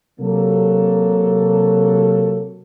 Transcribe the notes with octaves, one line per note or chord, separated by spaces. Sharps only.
C3 F#3 A#3 A4